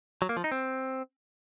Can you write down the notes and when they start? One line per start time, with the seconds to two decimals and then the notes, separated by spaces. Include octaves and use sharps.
0.22 F#3
0.29 A#3
0.37 F3
0.44 D#4
0.52 C4